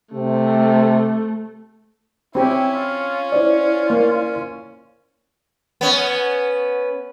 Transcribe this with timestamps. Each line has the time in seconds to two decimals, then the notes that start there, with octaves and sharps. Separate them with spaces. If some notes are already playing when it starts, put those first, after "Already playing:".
0.13 C3 A3
2.35 C4 C#4 E4 G4
2.75 F4
3.32 E4 F4 C5 D5
3.90 A#3
5.81 B3 C#4